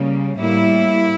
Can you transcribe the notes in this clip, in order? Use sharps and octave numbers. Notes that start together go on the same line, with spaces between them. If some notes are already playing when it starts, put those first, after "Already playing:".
Already playing: C#3 G3 A#3
A2 G3 A#3 E4